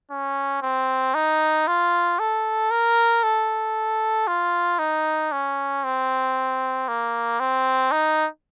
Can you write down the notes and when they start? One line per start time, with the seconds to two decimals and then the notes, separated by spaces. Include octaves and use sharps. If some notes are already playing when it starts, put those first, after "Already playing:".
0.11 C#4
0.62 C4
1.14 D#4
1.67 F4
2.19 A4
2.71 A#4
3.23 A4
4.27 F4
4.79 D#4
5.32 C#4
5.84 C4
6.88 A#3
7.40 C4
7.91 D#4